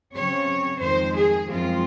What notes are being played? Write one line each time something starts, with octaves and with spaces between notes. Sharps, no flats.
C#3 F#3 C4 C#5
F2 D#3 G#3 C5
G#4
F#2 F3 G#3 C4 F4